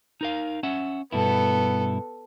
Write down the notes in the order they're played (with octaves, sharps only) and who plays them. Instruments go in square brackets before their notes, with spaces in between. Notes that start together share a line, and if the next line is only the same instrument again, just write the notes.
[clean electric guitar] D#4 A#4 F5
C#4 E5 F#5
[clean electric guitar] G2 B2 E4 [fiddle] B3 A4